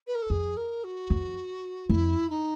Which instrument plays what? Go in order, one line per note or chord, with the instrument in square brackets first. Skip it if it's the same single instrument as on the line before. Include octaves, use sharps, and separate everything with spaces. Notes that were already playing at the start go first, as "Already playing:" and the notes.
[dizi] B4
A#4
A4
[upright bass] F2 [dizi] G#4
[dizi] A#4
F#4
[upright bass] F2
[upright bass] F2 [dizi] E4
[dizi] D#4